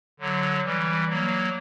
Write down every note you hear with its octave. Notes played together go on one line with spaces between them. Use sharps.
D3 F#3
E3 G3
F#3 A#3